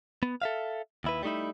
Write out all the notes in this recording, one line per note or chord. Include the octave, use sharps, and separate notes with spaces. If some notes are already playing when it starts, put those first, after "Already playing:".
B3
A4 E5 F5
D#2 E4 B4
G3 A3 D#4 E4